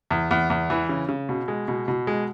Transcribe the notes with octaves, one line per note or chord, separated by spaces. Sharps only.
E2
E2
E2
E3
C#3
C#3
B2
G#3
B2
B2
G#3